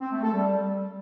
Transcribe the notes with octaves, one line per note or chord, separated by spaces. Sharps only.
C4
A3
A4
G3